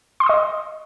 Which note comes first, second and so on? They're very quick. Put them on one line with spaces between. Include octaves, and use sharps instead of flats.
C6 C#6 D#6 D#5